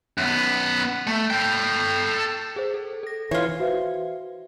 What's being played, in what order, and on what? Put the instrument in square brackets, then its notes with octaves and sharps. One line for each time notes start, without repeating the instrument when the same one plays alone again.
[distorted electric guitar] F#2 B3
A3
A4 G5
[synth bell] G#4 C5
A4
A4 A#6
[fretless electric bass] E3 [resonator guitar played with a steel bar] F4 C#5
[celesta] F#4 B4 C5 E5 F5